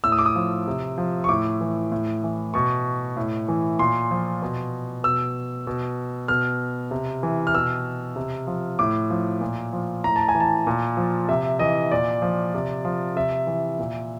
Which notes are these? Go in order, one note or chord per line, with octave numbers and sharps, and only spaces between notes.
A2 E6
D#6
D6
D#6
F3
C3
F3
C#6
A2 D6
E3
A2
E3
B2 C#6
A2
E3
A#2 C6
F3
B2
B2 E6
B2
B2 F6
C3
E3
F6
B2 E6
C3
F3
A2 D6
F3
A#2
F3
A2 A#5
A5
G#5
E3
A5
A#2
F3
C3 E5
E3 D#5
A#2 D5
F3
C3
F3
C3 E5
E3
A#2